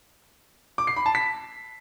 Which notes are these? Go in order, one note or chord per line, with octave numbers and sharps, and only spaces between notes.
D6
C7
B5
A5
B6